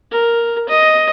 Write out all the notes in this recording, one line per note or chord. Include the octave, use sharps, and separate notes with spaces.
A#4
D#5